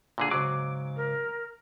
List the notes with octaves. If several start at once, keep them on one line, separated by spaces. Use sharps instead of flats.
A#2 D3 G#4
G#2 C#3 F#3 D6
A#4